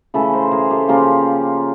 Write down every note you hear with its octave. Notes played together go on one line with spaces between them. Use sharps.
C#3 E3 A3 A4 B4
A#4 C5
G#4 A#4
G4 A4
C#3 F3 A#3 F4 G4